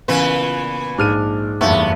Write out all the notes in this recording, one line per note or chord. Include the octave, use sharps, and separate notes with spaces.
A#2 C#3 E3 B3 B4
A#1 G#2 D4 F6 D#7
F#1 E2 G2 A3 B3